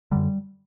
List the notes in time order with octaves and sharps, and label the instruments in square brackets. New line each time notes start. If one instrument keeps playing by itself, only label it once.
[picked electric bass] F#2 D3 G3